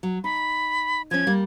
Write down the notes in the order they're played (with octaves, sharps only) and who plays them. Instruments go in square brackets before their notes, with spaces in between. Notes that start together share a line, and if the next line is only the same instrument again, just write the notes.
[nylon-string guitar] F#3
[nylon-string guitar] D#4 [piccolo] B5
[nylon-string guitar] F3 C#4 [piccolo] G#6
[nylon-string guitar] G3 A#3